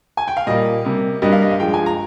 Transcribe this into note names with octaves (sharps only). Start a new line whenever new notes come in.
G#5
G5
F5
A#2 G3 A#3 D#5
C3 G3 A#3
G2 G3 A#3 D#5
F5
D#5
F5
G2 F3 G#3 G5
G#5
A#5